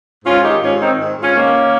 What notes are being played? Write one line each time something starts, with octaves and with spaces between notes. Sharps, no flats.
G#2 C#4 F4
D#3 D#4 G4
G#2 C#4 F4
D#3 C4 D#4
G#2
G#2 C#4 F4
D#3 A#3 C#4
D#3